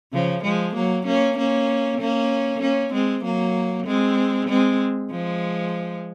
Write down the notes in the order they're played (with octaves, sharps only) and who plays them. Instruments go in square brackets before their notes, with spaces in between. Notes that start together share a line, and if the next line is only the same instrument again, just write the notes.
[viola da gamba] C#3 F3
F3 G#3
F#3 A#3
A#3 C#4
A#3 C#4
A#3 C#4
A#3 C#4
G#3 C4
F#3 A#3
G#3 C4
G#3 C4
F3 G#3